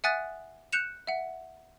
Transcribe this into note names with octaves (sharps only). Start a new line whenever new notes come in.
E5 F#5 G#5 D#6 F#6 A6
F#6 G6 C#7 E7 F7
E5 F#5